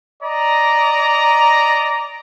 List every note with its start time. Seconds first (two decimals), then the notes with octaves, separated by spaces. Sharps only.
0.23 D5 D#5 A#5